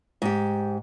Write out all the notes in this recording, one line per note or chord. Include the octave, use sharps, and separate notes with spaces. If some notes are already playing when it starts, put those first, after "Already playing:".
G#2 G4